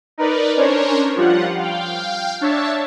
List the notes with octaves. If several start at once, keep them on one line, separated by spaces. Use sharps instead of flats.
D#4 A#4 B4 D5
C#4 D4 A#4 C5 C#5
F3 G3 F4 F#5
F5 G5
D4 C#5 E5 A5